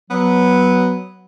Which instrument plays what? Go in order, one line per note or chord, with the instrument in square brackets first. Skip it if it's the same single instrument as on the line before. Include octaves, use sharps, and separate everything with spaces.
[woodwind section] F#3 [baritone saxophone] B3